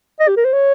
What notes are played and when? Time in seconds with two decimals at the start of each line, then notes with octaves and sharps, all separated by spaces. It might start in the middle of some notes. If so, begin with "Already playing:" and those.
0.20 D#5
0.28 G4
0.37 A#4
0.45 C5
0.53 C#5